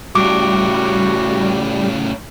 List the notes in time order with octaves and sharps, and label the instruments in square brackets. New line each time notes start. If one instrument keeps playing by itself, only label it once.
[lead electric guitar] A2 C#3 [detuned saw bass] G3 [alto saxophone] F#4 [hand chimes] D6